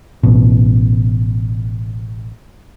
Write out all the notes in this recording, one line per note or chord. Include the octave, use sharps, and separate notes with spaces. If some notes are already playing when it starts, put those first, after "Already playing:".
A1 B2